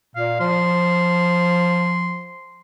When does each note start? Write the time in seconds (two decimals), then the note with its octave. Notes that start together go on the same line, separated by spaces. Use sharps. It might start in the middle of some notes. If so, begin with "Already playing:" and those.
0.16 A#2 F5
0.40 F3 C6